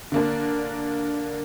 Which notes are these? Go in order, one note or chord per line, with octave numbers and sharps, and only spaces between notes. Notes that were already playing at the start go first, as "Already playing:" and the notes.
D3 A#3 D4